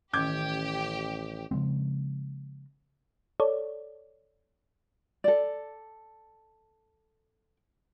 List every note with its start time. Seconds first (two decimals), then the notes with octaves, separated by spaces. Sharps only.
0.13 A1 D#3 C#4 G4 D6 G6 G#6
1.51 C#3 F3 G#3 C4
3.40 A4 C#5 D5
5.24 A4 D5